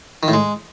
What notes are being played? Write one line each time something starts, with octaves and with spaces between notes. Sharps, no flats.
D#3
A2
G#3